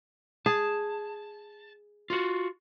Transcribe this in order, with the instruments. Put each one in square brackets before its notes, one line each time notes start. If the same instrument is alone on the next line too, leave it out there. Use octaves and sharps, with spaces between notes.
[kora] G#4 [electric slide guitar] A5
[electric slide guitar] F4 F#4